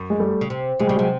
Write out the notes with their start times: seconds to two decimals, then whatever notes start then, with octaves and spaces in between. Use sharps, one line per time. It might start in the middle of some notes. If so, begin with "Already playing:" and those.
Already playing: F#2
0.10 G#3
0.20 G3 A3
0.41 C#3
0.50 C3
0.79 C3 G#3
0.87 C#3 G3
0.96 C3 F#3 G#3